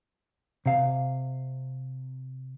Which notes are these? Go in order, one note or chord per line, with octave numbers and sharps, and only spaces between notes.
C3 F5